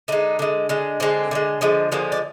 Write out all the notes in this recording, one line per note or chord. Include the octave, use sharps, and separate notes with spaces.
D3 G#3 D#4
D3 G#3
D3 G#3
D3 G#3 C4
D3 F3 G#3
D3 F3 G#3
D3 F3 G#3 A#3
D4